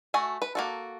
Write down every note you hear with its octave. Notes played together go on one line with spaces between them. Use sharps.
A3 F#4 G#5
B4
A#3 F#4 A4